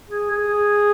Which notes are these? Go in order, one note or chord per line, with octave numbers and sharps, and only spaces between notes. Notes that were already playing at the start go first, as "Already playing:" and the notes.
G#4
G#4